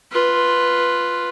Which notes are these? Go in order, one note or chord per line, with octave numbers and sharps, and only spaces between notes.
F4 B4